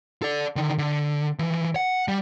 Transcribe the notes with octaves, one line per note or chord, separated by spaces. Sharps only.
A4 D5
D3 D#3
D3
E3 F3
F#5
G3